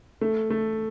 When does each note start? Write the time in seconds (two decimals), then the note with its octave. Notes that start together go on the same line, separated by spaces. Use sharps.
0.21 A3
0.50 A3